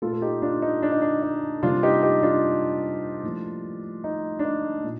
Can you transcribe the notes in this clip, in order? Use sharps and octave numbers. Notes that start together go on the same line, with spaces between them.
A#2 A3 F4 A4
A4
D#4 G4
D4 F4
D#4
D4
D#4
D4
D#4
C3 G3 A#3 D4 F4
D#4 G4
D#4 G4
D4 F4
A2 F3 A#3
D#4
D4
D#4
A#2